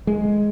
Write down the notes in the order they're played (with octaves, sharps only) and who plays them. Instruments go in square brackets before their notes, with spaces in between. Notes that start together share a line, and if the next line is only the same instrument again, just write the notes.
[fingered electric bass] G#3